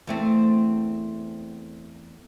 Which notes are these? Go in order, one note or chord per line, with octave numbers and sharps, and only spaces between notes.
E2 A3 C4